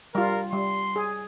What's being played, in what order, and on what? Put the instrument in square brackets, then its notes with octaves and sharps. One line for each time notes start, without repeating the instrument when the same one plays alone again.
[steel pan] G3 F4 [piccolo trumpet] A#4
[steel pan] G3 [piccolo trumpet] C6
[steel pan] G#4